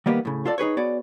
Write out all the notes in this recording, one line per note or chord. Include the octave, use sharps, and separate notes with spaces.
D#3 G3 A#3 B3 G4
A2 C#3
F4 A4 D5
D#4 G#4 B4 C#5
B3 F#4 G#4 C#5 D5